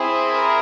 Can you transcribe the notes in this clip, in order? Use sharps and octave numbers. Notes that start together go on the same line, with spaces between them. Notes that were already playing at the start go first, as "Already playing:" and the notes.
Already playing: C4 E4 G#4
A#4